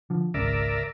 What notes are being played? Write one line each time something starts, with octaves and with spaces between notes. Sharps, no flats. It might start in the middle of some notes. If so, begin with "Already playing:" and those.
D3 F3
G#1 C#2 C#3 A#4 D5 E5